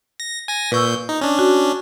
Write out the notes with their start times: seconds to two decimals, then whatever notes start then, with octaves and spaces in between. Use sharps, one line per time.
0.20 A#6
0.48 G#5 A#6
0.72 A#2 B4 C#6 E6 G6
1.09 D#4
1.21 C#4 D4
1.39 F#4